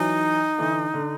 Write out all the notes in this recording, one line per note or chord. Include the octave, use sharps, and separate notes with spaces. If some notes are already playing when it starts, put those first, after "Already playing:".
Already playing: E3 F#3 D#4
D3 E3
D3